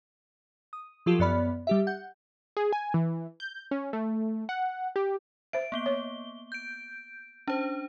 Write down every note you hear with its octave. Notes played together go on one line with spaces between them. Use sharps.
D#6
F3 F#3 F4 G4 A4
F#2 B3 D5 B5 F6
G3 G4 E5
F#5 G6
G#4
G#5
E3
G6
C#4
A3
F#5
G4
C5 E5 D7
A#3 B3 G7
C#5
G6 D7
C#4 D4 C5